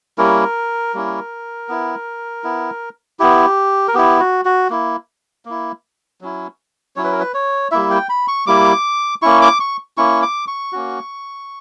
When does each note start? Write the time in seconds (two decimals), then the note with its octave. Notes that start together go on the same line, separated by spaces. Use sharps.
0.18 G3 A#3 C#4 E4 A#4
0.94 G3 A#3 C#4 E4
1.69 B3 E4
2.44 B3 E4
3.19 B3 E4 G4
3.88 A#4
3.94 B3 E4 G4
4.20 F#4
4.45 F#4
4.70 A#3 E4
5.45 A#3 E4
6.21 F#3 C#4 E4
6.96 F#3 C#4 E4 C#5
7.04 B4
7.12 A#4
7.20 B4
7.34 C#5
7.71 G3 A#3 E4 E5
7.90 G5
8.09 B5
8.28 C#6
8.47 G3 A#3 E4 D6
9.22 A#3 C#4 E4 C#6
9.41 D6
9.60 C#6
9.97 A#3 C#4 E4 C#6
10.22 D6
10.48 C#6
10.73 A#3 C#4 F#4